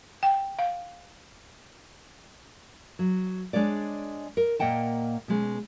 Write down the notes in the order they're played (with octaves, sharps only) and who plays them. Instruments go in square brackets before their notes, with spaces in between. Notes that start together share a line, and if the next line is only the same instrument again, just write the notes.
[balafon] G5
F5
[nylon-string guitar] F#3
G#3 D4 C#5 D5
A#4
A#2 A#3 D#5 F#5 G5 A5
B2 G#3 C#4